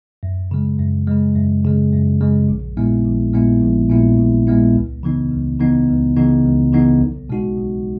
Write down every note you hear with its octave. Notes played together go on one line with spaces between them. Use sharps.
F#2
C#3 G#3
F#2
C#3 G#3
F#2
C#3 G#3
F#2
C#3 G#3
A#1
A#2 G#3 B3 E4
A#1
A#2 G#3 B3 E4
A#1
A#2 G#3 B3 E4
A#1
A#2 G#3 B3 E4
C#2
C#3 E3 B3 D#4
C#2
C#3 E3 B3 D#4
C#2
C#3 E3 B3 D#4
C#2
C#3 E3 B3 D#4
B1
B2 G#3 D#4 F#4
B1